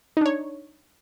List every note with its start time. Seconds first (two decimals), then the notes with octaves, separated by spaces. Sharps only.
0.17 D#4
0.21 D4
0.26 C#5